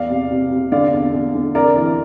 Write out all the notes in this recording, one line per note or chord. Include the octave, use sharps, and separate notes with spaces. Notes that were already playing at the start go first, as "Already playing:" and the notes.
Already playing: E2 D5 F5
C3
C3
C3
D3 D5 F5
E2
E2
D3
F2 A#4 D5
E3